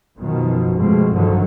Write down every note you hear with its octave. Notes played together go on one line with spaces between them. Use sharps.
F#2 B2 D#3 F3
B2 F3 G#3 A3 C4
G2 D3 D#3 F3 F#3